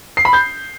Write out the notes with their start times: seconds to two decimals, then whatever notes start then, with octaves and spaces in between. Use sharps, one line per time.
0.17 C7
0.25 B5
0.33 G6